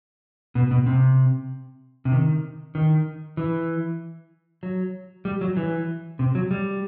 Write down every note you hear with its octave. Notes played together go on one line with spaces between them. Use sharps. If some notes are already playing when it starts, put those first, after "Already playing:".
B2
B2
C3
C3
D#3
D#3
E3
F#3
G3
F#3
E3
C3
F#3
G3